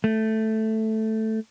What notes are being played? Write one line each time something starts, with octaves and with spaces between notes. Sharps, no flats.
A3